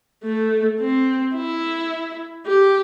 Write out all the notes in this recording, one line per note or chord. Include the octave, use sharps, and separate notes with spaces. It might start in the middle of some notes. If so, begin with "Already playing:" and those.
A3
C4
E4
G4